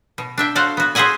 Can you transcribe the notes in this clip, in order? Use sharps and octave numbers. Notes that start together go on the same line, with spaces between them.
B2
D4 E5 G5
F#4 A4 C5 F5 F#5 A5
B3 F#4
G#4 C5 D#5 E5 F#5 G#5